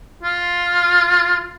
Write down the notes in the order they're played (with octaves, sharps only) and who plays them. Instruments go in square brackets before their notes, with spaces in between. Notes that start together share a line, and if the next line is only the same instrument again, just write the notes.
[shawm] F4